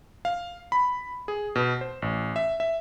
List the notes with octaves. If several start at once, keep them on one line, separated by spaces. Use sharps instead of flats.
F5
B5
G#4
B2
C5
A1
E5
E5